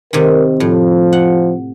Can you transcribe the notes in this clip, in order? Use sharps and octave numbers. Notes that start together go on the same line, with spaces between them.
C3 D#3 A#4
A2 F3
F#5